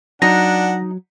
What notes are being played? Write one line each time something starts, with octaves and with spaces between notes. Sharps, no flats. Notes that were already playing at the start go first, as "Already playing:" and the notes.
F#3 D4 D#4 F#5 A#6